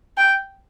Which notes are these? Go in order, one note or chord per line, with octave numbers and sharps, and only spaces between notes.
G5